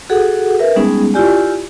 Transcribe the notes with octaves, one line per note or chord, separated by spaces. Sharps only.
F#4 G#4 A4 F#5
A#4 B4 E5
G3 G#3 B3 C#4 D#4 G#4
E4 F4 G4 D5 G#5